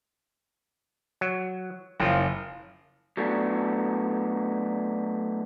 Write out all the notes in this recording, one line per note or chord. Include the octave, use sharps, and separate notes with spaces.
F#3
F#1 F3 F4 G5
F#3 A3 B3 D4